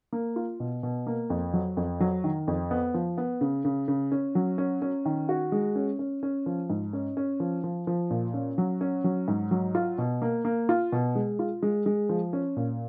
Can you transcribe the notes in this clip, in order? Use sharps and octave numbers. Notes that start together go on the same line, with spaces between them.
A#3
F4
B2
B2
A#3
F2
F#3
F2
F#3
D#3
F2
B3
F3
B3
C#3
C#3
C#3
C#4
F#3
C#4
C#4
D#3
F#4
G#3
C#4
C#4
C#4
F3
G#2
C#4
C#4
F3
F3
F3
A#2
C#4
F#3
C#4
F#3
G#2
F#3
F4
B2
A#3
A#3
F4
B2
G#3
F4
G#3
G#3
F3
C#4
A#2